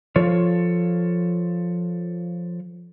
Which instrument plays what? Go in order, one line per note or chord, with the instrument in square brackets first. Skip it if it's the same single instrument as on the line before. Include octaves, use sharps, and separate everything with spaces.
[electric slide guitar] F3 F4 A4 C#5